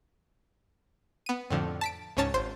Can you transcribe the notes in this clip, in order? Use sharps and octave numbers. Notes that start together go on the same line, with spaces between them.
B3 D#7
F2 A2 D3 F3
A5 B6 D7
C#2 G#2 C#4 C#5 A5 A6
G#1 C5 C6